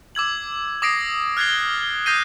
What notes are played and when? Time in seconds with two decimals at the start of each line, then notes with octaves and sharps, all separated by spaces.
0.15 D6 E6 G#6 F#7
0.82 D6 D#6 A#6 C7 D7
1.37 F6 F#6 G#6 A6 C7 G7
2.06 D#6 G6 A#6 C7 D#7